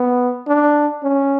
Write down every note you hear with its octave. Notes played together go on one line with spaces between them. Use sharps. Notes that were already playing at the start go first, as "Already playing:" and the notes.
Already playing: B3
D4
C#4